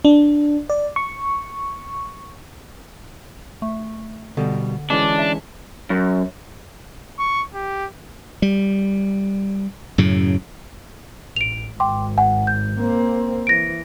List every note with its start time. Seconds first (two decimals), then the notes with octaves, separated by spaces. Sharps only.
0.05 D4
0.70 D5
0.96 C#6
3.62 A3
4.37 B2 D3 G3
4.90 E3 G#3 C#4 D4
5.19 E5 A5
5.90 F#2
7.19 C#6
7.54 G4
8.42 G3
9.98 F#2 A2 C#3
11.36 A1 D7 F7
11.80 G#1 G5 C6 D6
12.18 F#5 G#5
12.47 G6
12.80 A#3 C4
13.47 E3 A#6 D7